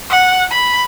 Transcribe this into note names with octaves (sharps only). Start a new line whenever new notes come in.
F#5
B5